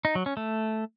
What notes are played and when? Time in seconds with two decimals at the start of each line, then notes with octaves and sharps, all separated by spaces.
0.05 D#4
0.15 F#3
0.26 C#4
0.37 A3